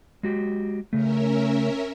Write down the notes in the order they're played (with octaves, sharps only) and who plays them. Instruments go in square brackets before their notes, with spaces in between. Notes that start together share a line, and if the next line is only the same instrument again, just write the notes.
[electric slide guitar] G#3 F#4 G4
[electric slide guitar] C#3 A3 [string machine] C#4 A#4 E5